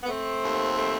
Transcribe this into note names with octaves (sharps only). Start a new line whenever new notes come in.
B3
A3 C4
D#2
A3